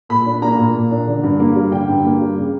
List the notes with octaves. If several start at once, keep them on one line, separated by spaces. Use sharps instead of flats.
A#2 B5
D4
A#3 A#5
A#2
A#2
D4
D3
G2
A#3
G3
D3 G5
G2
A#3
G3
C#3